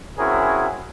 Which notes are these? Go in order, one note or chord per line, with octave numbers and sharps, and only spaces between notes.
C4 C#4 E4 F#4 G#4 A#4